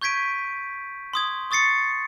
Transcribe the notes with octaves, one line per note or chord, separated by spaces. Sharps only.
C#6 G6 G#6 B6 D7 D#7
C6 D#6 G#6
C#6 D#6 A6 C7 C#7